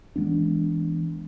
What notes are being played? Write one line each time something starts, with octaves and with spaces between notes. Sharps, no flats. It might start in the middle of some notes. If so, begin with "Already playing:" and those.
E3 G#3 B3 D4